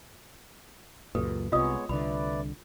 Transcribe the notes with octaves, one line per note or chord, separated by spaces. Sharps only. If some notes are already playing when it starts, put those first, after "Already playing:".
C#2 F#2 A#2 G4 A4 B4
C2 C3 G#3 B3 F4 C#5 D#5 D#6
C2 D3 A3 B4 D5 B5